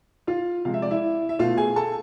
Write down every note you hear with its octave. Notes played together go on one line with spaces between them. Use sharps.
F4 F5
C3 F3 G#3 F5
E5
D5
E4 E5
E5
B2 A3 F4 F5
G#4 G#5
A4 A5